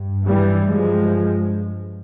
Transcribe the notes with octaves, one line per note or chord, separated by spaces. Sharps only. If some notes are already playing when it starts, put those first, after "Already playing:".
Already playing: G2
E3 G3
G2 F3 G#3